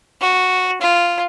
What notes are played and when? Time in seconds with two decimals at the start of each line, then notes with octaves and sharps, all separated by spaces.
0.21 F#4
0.81 F4